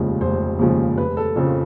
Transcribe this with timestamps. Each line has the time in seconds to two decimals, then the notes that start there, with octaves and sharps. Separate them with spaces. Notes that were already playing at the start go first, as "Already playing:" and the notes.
Already playing: F1 D#2 C#3 F3 G#3
0.21 F1 C5
0.59 D#2 C#3 F3 G#3
0.98 F1 B4
1.17 A4
1.36 F2 C#3 F3 A4